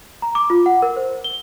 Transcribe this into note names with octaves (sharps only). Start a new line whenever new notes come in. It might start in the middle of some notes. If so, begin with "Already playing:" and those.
A#5
D6
F4
F#5
A#4
C5
G7